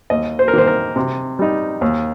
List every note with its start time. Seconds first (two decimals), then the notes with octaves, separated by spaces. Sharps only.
0.10 D#2 D#5
0.39 C5
0.48 A#4
0.53 D#3 A#3 C5
0.67 A#4
0.96 C3
1.39 G3 D#4
1.81 D#2